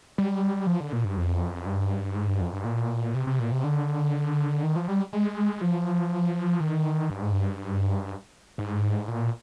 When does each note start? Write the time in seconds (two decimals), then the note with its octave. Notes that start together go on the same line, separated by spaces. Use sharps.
0.18 G3
0.67 F3
0.80 D3
0.93 A#2
1.05 G2
1.17 F2
1.66 G2
2.15 G#2
2.28 G2
2.41 F2
2.53 G2
2.65 A#2
3.14 C3
3.27 C3
3.39 A#2
3.52 C3
3.64 D3
4.63 D#3
4.76 F3
4.88 G3
5.13 G#3
5.61 F3
6.60 D#3
7.10 G2
7.22 G#2
7.32 G2
8.58 G#2
9.08 A#2